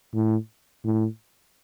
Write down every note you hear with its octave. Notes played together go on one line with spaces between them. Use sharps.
A2
A2